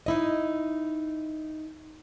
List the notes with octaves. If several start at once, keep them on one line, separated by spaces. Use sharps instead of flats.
D#4 E4 D#5